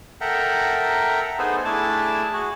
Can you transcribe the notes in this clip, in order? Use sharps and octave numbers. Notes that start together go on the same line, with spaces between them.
A4 A#4 E5 F#5 G5 A#5
B3 D#4 G#4 A4 B4 C5
A3 D4 E4 G#4 A5
F#4 G#4